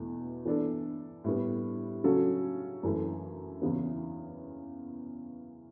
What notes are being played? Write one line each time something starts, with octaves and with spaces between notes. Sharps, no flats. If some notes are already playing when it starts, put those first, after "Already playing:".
Already playing: E2 B2 A3
E3 B3 D4 A4
A2 G3 B3
C#3 F#3 C#4 F#4 A4
F#2 E3 A3
E2 C#3 E3 B3